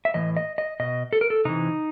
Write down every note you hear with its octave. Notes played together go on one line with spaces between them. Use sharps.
E5
A2 E3 D#5
D#5
D#5
B2 D#5
A4
A#4
A4
C3 E3 D#4